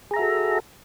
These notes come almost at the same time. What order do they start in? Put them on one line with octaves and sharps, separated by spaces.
G#4 A#5 E5 F#4 A4